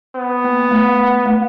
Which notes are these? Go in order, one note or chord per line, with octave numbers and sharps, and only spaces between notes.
B3
A#3
A3
A3